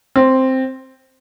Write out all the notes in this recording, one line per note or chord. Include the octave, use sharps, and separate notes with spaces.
C4